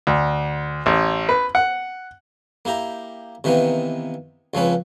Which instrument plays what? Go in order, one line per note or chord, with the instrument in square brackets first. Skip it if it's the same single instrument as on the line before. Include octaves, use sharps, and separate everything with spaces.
[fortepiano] D2
A1
B4
F#5
[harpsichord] A#3 E4 G4 A#5
C3 D#3 E3 A#3 B3
C#2 F3 C4 C#4 B4